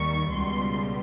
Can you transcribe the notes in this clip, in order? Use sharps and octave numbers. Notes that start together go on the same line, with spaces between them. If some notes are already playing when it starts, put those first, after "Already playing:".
Already playing: D#2 D#3 G3 C#6
C#2 B2 G3 C6